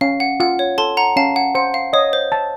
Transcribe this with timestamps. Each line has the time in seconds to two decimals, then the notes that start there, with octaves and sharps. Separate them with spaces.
0.01 C#4 F5
0.20 F#5
0.40 F4 F#5
0.59 C#5
0.78 A4 A5 C6
0.97 F#5 A#5
1.16 C#4 F5 A5
1.36 F#5
1.55 C5 F#5
1.74 F5
1.93 C#5 D#5
2.13 C5
2.32 A5